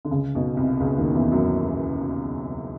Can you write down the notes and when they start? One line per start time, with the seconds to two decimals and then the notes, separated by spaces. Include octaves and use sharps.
0.05 D3
0.11 C#2 C#3
0.35 B1 B2
0.57 C2 C3
0.80 C#2 C#3
0.98 D#2 D#3
1.14 E2 E3
1.32 F#2 F#3